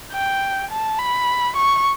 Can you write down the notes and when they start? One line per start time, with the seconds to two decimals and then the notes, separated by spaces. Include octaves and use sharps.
0.13 G5
0.71 A5
0.99 B5
1.56 C#6